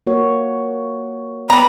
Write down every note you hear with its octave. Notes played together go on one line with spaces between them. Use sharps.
A#3 F#4 C#5
G3 B3 A#5 B5